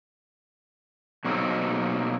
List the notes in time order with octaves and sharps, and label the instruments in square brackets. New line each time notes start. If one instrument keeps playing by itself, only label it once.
[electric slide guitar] B2 F#3 A#3 C4 D#4 A4